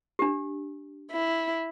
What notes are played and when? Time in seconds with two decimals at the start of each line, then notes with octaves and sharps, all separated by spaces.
0.19 D4 G4
1.12 E4